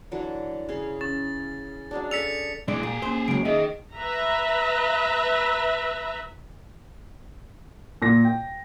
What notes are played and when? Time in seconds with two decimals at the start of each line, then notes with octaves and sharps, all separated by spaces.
0.12 D3 E3 F#3
0.69 C#3 G#4 C6
1.01 C#4 A6
1.91 F#3 G#3 D4
2.11 D4 G#4 A4 E6 B6 C#7 F7
2.68 A#2 E3 G#3 D4 D5 D7
2.83 A#2 G4 G#4
3.02 A#3 C#4 C5
3.28 C#3 F#3 G#3 D7
3.45 D#3 G#4 D#5 E5
3.94 B4 E5 A#5
8.02 A#2 A#6
8.25 G5